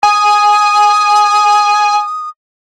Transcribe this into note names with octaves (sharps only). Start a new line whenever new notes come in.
G#5 D#6